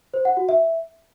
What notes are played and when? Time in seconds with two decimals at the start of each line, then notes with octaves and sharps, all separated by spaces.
0.14 C5
0.25 F#5
0.37 F#4
0.49 E5